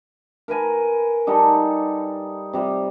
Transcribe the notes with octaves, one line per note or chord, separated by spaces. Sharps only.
A#4 B4 G#5
G3 D#4 A4
C3 G3